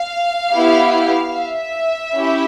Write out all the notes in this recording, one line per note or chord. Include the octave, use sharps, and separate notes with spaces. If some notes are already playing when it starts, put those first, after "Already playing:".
Already playing: F5
B3 E4 G4
E5
C#4 E4 G4